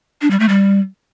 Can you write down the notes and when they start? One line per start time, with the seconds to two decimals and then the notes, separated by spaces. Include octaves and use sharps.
0.21 D4
0.31 G3
0.40 A3
0.49 G3